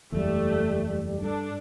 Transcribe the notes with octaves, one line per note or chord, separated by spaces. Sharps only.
F#1 E2 G3 A3
G2 D4 A4